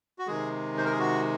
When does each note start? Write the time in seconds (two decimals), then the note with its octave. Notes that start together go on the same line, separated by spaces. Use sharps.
0.19 F#4
0.27 C3 D#3 G#3 G#4
0.78 C5
0.85 A#4
0.91 G#4
0.99 F#4